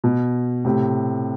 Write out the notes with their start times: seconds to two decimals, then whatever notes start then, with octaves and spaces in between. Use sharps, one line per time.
0.04 B2
0.65 A2 C3